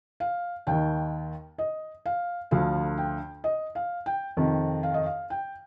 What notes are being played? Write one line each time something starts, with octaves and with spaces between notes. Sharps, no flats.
F5
D#2 D#3 G5
D#5
F5
D2 D3 F3 F5
G5
D#5
F5
G5
F2 C3 D#3
F5
D#5
F5
G5